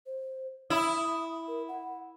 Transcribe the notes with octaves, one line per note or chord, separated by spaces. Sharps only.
C5
E4 D#6
A#4
F#5